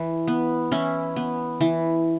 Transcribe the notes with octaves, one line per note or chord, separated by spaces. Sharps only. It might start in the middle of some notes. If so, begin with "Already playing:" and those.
Already playing: E3
B3
E3 C#4 E4
B3
E3